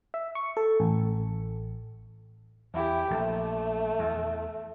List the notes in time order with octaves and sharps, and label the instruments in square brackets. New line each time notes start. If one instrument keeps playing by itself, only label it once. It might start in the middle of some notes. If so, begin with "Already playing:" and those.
[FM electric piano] E5
C#6
A4
A1
[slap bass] E2 [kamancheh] E4 G4
[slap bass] A#1 [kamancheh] A3
[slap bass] E2